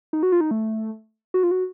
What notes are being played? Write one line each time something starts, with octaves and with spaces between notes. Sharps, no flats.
D#4
F#4
F4
D#4
A3
F#4
F4
F#4